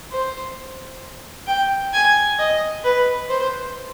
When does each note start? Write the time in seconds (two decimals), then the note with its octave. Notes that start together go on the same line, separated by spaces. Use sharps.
0.12 C5
1.47 G5
1.93 G#5
2.39 D#5
2.84 B4
3.29 C5